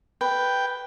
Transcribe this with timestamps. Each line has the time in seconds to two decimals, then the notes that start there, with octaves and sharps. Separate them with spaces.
0.21 B4 G5